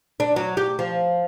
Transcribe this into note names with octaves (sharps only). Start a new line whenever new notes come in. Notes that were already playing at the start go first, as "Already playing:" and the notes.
D4
F#3
G4
F3